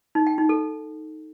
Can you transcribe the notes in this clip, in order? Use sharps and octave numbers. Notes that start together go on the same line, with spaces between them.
D#4
G5
D#4
A4